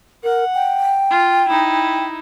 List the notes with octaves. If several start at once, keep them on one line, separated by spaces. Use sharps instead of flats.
A#4 F#5
G5
F4
D#4 E4